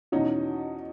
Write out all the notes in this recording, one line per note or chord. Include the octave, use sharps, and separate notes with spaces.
E2 B2 C#4 D#4